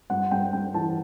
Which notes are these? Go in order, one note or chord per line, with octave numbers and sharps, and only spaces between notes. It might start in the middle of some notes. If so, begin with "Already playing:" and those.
G2 F#5
G2 G5
G2 G5
E3 A5